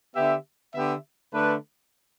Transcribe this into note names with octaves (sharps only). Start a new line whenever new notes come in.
D3 B3 G4 E5
D3 B3 G4 E5
D3 A3 D4 B4